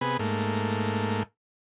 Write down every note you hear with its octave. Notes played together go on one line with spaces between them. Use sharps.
C3 B3 G#4 B5
G#2 A3 A#3